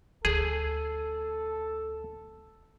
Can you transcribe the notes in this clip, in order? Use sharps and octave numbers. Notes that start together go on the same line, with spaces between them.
D2 G#4 A4